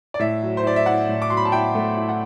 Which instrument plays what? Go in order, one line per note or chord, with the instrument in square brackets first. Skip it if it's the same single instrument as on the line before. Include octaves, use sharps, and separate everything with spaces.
[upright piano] D5
A2 E5
F#3
C5
E4 D5
E5
E4 F#5
A2
D6
F#3 C6
B5
A5
E4 G5
A3
E4
F#5